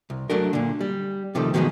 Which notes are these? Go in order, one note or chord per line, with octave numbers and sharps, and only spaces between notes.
C2
F#3 A3 D4 A#4
A#2 D3
G3
C3 D#3 F3 G3 A3
B2 D#3 F3 F#3 G#3 B3